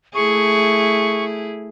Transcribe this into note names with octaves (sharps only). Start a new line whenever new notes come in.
A3 E4 G#4 C#6